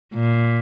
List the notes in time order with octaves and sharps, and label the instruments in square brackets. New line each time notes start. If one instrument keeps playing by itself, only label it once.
[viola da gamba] A#2